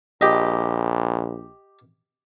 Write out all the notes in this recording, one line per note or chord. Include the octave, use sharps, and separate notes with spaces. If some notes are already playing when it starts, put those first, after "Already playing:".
A#1 G4 D#5